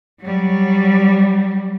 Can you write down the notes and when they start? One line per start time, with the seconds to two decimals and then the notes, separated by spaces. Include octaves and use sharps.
0.21 F#3 G3